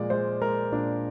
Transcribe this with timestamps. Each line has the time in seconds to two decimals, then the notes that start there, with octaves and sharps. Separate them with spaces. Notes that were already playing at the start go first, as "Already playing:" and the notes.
Already playing: A#2 F3 G#3 D5
0.10 G#3 C5
0.41 G#3 A#4
0.72 A#2 D4